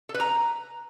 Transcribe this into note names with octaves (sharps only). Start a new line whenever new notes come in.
A4
B4
A#5